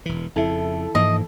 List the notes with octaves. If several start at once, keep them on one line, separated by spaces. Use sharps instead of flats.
E1 E3
F2 C#3 E4 A4
G#2 E3 F3 A#3 D#5